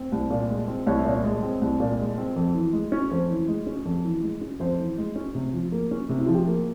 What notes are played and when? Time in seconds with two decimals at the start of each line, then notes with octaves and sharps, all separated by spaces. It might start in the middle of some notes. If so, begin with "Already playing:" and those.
Already playing: C4
0.12 C2
0.30 A#2
0.50 G#3
0.68 C4
0.86 C2 C#5
0.98 E5
1.05 A#2 C#5
1.24 G#3
1.42 C4
1.61 C2
1.80 A#2
1.99 G#3
2.18 C4
2.36 F2
2.54 E3
2.73 G#3
2.92 C#4
3.11 F2 C5
3.30 E3
3.48 G#3
3.67 C#4
3.85 F2
4.04 E3
4.22 G#3
4.41 C#4
4.60 F2 C5
4.79 E3
4.98 G#3
5.16 C#4
5.35 C3
5.53 F3
5.72 A#3
5.91 C#4
6.09 C3
6.18 E4
6.26 F3 F4
6.34 G4
6.47 A#3